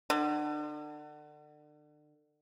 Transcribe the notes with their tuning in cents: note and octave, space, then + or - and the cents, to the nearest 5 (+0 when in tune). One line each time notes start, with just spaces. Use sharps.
D3 +35